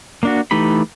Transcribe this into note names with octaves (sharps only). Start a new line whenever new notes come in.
A#3 D4 F#4
E3 A3 D#4 G4 B5